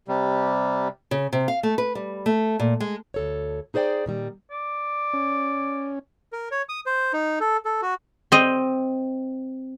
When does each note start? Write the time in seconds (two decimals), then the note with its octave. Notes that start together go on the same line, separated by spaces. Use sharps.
0.08 C3 G3
1.11 C#3
1.33 C3
1.48 F5
1.63 A3
1.78 B4
1.95 G3
2.26 A3
2.59 A#2
2.80 G#3
3.14 D2 A4 C#5
3.74 D#4 G#4 C5 D5 G5
4.06 A#2 D#3 G3
4.51 D5
5.13 C#4
6.33 A#4
6.51 C#5
6.69 D#6
6.86 C5
7.13 D#4
7.40 A4
7.65 A4
7.82 F#4
8.32 C4 D#5